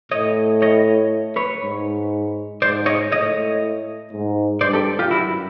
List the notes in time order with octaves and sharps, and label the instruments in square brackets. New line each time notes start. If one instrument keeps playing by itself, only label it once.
[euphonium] A2 [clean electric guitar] C#5 D#5
[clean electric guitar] C#5 D#5
B4 C#5
[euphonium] G#2
[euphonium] G#2 [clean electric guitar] C5 D5
[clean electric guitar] C#5 D#5
[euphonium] A2 [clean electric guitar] C#5 D#5
[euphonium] G#2
[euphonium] G2 [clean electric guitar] C5 D5
[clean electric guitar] G4 A4
F4 G4
[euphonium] F#2 [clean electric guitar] E4 F#4